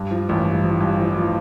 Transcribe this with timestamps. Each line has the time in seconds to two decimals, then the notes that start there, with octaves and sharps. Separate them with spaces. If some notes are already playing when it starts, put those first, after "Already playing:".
Already playing: G2
0.11 F3
0.29 A1
0.45 G2
0.63 F3
0.81 G2
0.99 F3
1.16 F3